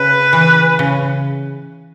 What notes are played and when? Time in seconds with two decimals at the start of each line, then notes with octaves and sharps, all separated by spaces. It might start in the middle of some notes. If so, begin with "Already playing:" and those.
Already playing: C#3 B4
0.33 E3
0.79 C#3